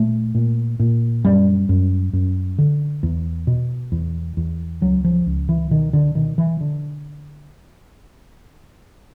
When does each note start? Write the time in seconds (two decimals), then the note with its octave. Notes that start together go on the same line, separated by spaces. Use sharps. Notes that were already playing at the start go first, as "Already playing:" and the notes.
Already playing: A#2 A3
0.35 A#2
0.80 A#2
1.25 F#2 G3
1.69 F#2
2.13 F#2
2.59 D3
3.03 E2
3.47 B2
3.92 E2
4.37 E2
4.81 C#2 F#3
5.05 F3
5.26 C#2
5.49 E3
5.70 B2 D#3
5.93 D3
6.15 B2 D#3
6.38 E3
6.61 D3